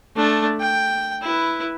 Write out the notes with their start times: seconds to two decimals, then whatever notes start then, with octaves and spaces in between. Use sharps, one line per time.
0.16 A3 D4
0.60 G5
1.22 E4 B4